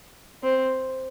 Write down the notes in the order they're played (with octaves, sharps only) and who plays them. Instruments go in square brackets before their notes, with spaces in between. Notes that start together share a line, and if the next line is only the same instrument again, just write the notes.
[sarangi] C4